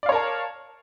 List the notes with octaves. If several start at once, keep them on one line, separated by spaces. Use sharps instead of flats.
A#4 C#5 D5 F5 A5